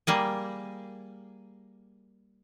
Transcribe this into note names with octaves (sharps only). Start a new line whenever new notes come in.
G3 A#3 G#4